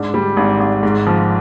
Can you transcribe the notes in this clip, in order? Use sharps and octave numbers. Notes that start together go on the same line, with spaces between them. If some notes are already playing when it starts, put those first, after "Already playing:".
Already playing: G#2 D4
G3
G#1
G#1
G#2
F3